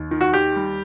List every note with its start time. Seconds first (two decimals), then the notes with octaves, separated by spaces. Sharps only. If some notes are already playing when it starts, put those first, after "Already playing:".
Already playing: D#2
0.11 D#3
0.21 F#4
0.33 D#2 G4
0.56 G3